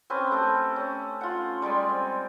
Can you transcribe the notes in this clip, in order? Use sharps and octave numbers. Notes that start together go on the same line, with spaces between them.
C4 C#4 B4
A3 G4 A4
C#4
F4 F#5
G3 G#3 D5 G#5
C4